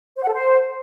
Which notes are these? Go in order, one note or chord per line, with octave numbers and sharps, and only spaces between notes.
C5
F#5
A4
C5